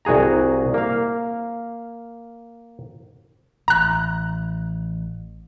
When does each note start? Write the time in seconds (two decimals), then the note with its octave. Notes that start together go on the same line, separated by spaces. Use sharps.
0.05 C2 F#4 G#4 A#5
0.74 A#3 F5
3.68 A1 A#5 F#6